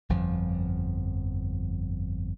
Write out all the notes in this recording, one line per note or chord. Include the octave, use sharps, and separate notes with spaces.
G1 F2 F3